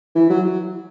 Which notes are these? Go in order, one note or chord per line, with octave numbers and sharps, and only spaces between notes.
E3
F#3